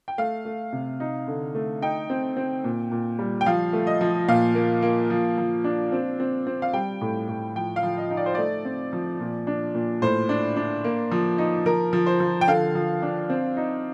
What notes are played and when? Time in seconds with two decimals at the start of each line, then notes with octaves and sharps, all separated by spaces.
0.08 G5
0.18 A3 F5
0.45 A3
0.73 C3
1.00 D#4
1.27 D3
1.55 A3
1.82 D#4 G5
2.10 C4
2.37 C4
2.64 A#2
2.92 A#2
3.19 G3
3.41 G5
3.46 F3 F5
3.73 A3
3.87 D#5
4.01 F3
4.28 A#2 F5
4.55 A#3
4.82 A#3
5.10 F3
5.38 F3
5.64 D4
5.92 C4
6.20 C4
6.47 C4
6.62 F5
6.74 G3 G5
7.01 A2
7.28 A2
7.56 F3 G5
7.76 F5
7.83 F3
7.97 D#5
8.11 D#4
8.17 D5
8.26 C5
8.35 A3 D5
8.65 C4
8.93 F3
9.20 A#2
9.47 D4
9.75 A#2
10.02 A2 C5
10.29 D4
10.56 D4
10.84 A#3
11.11 F3
11.38 D#4
11.66 F3 A#4
11.93 F3
12.06 C5
12.20 F3
12.41 G5
12.48 D3 F5
12.75 F3
13.02 D4
13.30 C4
13.57 D#4